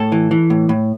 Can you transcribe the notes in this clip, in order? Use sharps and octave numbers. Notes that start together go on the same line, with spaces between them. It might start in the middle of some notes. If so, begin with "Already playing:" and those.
Already playing: A2 A4
E3
E3
A2
A2